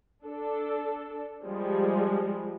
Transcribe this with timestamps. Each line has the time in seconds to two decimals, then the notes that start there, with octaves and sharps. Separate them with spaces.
0.23 D4 A4
1.44 F3 G3 G#3